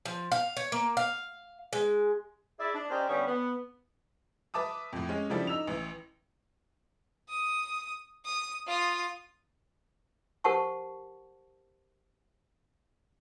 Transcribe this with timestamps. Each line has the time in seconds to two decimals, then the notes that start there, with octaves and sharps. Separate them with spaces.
0.05 F3
0.32 F5
0.57 C#5
0.72 A#3
0.97 F5
1.73 G#3
2.59 E4 G#4 D5 E5
2.75 D4
2.90 C#4 G4 A#4 C5 D5 D#5
3.09 D3 G3 B3 C#4 B4
3.27 B3
4.54 B4 E5 A5 D6 D#6
4.93 F2 A2
5.09 G#3 C#4
5.30 C#3 F3 G3 D4 E4 A4
5.47 D#4 E6 F7
5.67 A1 E3
7.29 D#6
8.25 D#6
8.67 F4 D#6
10.44 G4 A#4 C5 F#5 A5 C#6